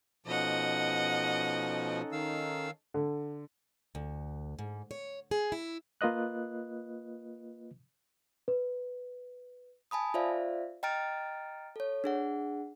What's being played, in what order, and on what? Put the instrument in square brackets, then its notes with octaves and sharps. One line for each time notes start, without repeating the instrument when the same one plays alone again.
[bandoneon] B2 F3 [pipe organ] C#4 D#4 A4 [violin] D#5 F#5
[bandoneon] D#3 F5 E6
[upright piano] D3
[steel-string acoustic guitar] D2
G#2
C#5
G#4
E4
[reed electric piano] A#3 F4 B4 D#5 F#6
[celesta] B4
[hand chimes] G#5 A5 B5 D#6
F4 C5 D5 E5 F5
D#5 G5 A#5 F6 A6 D7
A4 C#5
D4 G#4 F#5